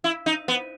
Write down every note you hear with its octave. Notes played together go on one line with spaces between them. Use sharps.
E4
D#4
B3